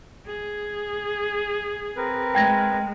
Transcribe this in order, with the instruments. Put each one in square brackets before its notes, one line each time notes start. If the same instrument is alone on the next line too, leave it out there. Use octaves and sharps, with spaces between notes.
[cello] G#4
[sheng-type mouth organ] C4 A#4 B4
[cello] G#3 [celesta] G5 G#6 A#6